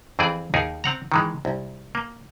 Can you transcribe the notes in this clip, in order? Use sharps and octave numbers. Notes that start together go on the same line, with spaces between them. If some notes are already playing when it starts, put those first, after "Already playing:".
F2 E3 C4 G#4 D5
D#2 D#4 G#4 A#4
C4 F#5 A#5
D#3 E3 G#3
C2
A#3